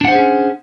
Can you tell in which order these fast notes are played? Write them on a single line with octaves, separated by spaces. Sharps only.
D4 F#5 C5 G#4 C#4